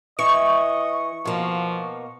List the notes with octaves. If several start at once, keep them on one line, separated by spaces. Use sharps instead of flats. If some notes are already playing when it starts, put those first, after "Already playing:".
E3 D#5 C#6
B2 F3 A#3